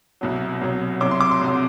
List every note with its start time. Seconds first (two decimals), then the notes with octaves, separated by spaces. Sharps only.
0.21 C2 B2 F#3
0.61 C2 B2 F#3
1.01 C2 C3 F#3 D6
1.11 C6
1.21 D6
1.31 C6
1.41 C2 C3 F#3